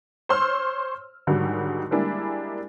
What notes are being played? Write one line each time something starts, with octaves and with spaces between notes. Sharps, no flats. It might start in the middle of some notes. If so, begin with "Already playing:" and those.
C5 C#5 C6 E6 F6
G#2 D3 D#3 F#3 G3
G3 G#3 A#3 D4 E4